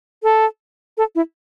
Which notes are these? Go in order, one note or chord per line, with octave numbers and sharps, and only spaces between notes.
A4
A4
E4